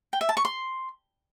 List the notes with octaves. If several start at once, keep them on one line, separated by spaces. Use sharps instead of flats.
G5
E5
A5
C#6
C6